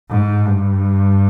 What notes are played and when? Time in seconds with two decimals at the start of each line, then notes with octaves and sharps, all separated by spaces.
0.10 G#2
0.46 G2